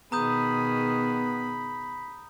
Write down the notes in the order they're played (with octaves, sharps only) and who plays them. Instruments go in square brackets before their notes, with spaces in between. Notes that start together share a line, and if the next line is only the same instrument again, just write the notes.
[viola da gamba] B2 D#3 G#4 [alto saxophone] B3 [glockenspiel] A#5 D#6 G6 [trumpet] B5